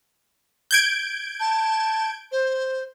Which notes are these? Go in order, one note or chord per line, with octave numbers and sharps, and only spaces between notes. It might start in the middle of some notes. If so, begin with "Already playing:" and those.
G6 G#6 D7
A5
C5